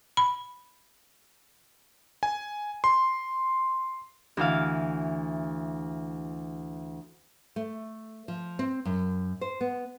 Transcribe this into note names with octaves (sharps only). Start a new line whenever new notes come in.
B5
G#5
C6
D2 E3 F5
A3
F3
C4
F#2
C5
B3